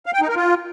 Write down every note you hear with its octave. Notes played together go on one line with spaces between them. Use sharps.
F5
G5
D#4
A#4
F4